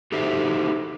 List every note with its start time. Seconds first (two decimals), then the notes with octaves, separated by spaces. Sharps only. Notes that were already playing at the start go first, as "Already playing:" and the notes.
0.12 D#4 F#4 G4 A4 C5 E5